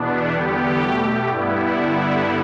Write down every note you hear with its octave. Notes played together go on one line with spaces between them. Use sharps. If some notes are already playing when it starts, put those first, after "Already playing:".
Already playing: E2 B2 B3 D4
E2 D3 G3 B3 G4
B2 A3
G2 G3 B3 E4
G2 D3 G3 B3 E4